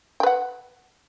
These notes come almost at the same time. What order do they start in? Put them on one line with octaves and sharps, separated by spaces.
G5 B4 F#5